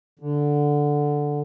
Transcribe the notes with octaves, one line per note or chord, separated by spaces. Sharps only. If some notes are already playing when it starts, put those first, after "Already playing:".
D3